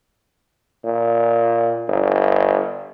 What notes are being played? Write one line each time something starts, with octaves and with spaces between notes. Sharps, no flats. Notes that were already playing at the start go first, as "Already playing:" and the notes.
A#2
G1